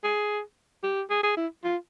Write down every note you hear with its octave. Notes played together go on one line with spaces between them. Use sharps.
G#4
G4
G#4
G#4
E4
F4